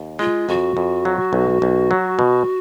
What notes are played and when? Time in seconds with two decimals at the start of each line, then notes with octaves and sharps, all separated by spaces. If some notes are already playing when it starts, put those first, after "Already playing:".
Already playing: D#2
0.19 G#3 F4
0.48 F2 F#4
0.77 F2
1.05 F#3
1.33 B1
1.62 B1
1.91 F#3
2.19 B2